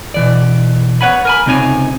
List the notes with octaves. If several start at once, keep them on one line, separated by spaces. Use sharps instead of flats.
B2 E3 D5
B3 B4 C#5 F#5 G#5 B5
A#4 G#5 B5
C#2 C3 C4 D#4 C#5 G#5